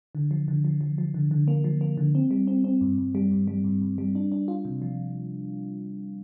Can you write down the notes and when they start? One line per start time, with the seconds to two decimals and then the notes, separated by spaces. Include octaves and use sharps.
0.15 D3
0.31 F3
0.48 D3
0.65 F3
0.81 F3
0.98 F3
1.14 D3
1.31 D3
1.48 A#3
1.64 F3
1.81 A#3
1.97 D3
2.15 C4
2.31 G3
2.47 C4
2.64 C4
2.81 G2
2.98 G2
3.15 G3
3.31 G2
3.48 G3
3.64 G2
3.82 G2
3.98 G3
4.15 D4
4.32 D4
4.48 F4
4.65 C3
4.82 F3